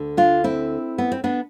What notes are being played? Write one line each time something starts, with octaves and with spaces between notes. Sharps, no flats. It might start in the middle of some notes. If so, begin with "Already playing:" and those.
Already playing: D2 D3
D4 F4
C4 E4
B3
C4
B3 D4